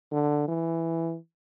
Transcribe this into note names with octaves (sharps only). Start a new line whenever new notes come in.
D3
E3